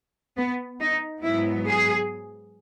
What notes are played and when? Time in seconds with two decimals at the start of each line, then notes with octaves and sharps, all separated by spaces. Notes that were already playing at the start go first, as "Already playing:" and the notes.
0.37 B3
0.80 D#4
1.23 G#2 F#3 B3 E4
1.67 G#4